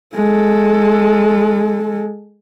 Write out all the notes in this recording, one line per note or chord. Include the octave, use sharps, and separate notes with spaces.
G#3 A4